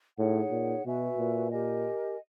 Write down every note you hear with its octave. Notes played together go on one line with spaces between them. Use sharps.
A2 D#4 G#4 C#5 F#5
A#2
B2 F#4 B4 E5 G#5
A#2
G4 A#4 D#5 G#5